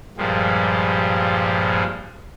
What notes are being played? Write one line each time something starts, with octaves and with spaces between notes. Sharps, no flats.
G2 A#2 F3 G3 G#3